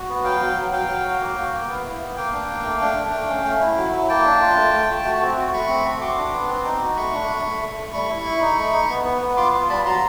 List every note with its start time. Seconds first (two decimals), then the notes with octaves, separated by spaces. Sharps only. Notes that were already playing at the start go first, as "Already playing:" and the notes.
Already playing: F#4
0.09 B3
0.24 F#3 F5 G5
0.41 F#3
0.57 F#3
0.72 F#3 F5 G5
0.88 F#3
1.05 F#4
1.20 A#3
1.37 F#4
1.53 A#3
1.69 B3
1.84 E4
2.01 B3
2.16 A#3 F5 G5
2.33 D4
2.49 A#3
2.64 A3
2.81 D4
2.97 D4
3.13 A3
3.29 C#4
3.45 A3
3.61 E4
3.77 F#3
3.93 E4
4.09 A#3 G5 A5
4.25 D4
4.41 F4
4.56 A3
4.73 A3
4.89 A3
5.05 F#4
5.22 C4
5.37 F#4
5.53 A3 B5 C#6
5.69 C4
5.85 C4
6.01 F#4 C6 D6
6.17 D4
6.34 B3
6.49 C4
6.65 D#4
6.82 F#4
6.97 A3 B5 C#6
7.13 D4
7.29 A3
7.45 A3
7.62 A3
7.77 A3
7.93 G3 B5 C#6
8.09 E4
8.26 E4
8.41 D#4
8.58 A3
8.73 D#4
8.90 B3
9.05 B3
9.22 B3
9.37 F4 C6 D6
9.54 F4
9.69 G3 A5 B5
9.85 F#3 A#5 C6